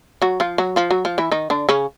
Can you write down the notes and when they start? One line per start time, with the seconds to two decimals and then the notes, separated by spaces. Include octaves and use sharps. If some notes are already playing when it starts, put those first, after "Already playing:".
0.22 F#3 F#4
0.40 F3 F4
0.58 F#3 F#4
0.76 F3 F4
0.91 F#3 F#4
1.05 F3 F4
1.18 E3 E4
1.31 D#3 D#4
1.50 D3 D4
1.69 C#3 C#4